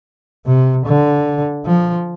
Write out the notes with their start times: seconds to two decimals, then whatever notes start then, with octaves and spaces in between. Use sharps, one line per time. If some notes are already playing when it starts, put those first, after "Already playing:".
0.46 C3
0.86 D3
1.66 F3